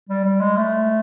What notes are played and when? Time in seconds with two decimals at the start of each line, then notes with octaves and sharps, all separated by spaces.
0.09 G3
0.25 G3
0.41 G#3
0.56 A3